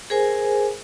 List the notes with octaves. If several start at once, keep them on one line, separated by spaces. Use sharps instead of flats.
G#4 A#4 C5 G#5